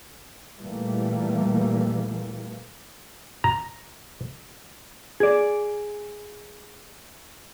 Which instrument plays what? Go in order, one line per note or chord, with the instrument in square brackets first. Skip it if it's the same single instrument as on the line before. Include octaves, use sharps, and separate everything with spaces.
[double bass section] E2 A#2 E3 G3 A3 A#3
[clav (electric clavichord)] A#5
[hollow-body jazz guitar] G#4 D5